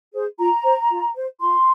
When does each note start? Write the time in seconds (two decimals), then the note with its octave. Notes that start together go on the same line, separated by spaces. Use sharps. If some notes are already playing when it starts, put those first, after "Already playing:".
0.14 G#4 C5
0.38 F4 A#5
0.64 C5
0.89 F4
1.15 C5
1.40 F4 C6